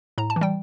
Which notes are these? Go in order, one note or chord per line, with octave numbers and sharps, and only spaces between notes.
A2 A#5
A5
E3
G3 G5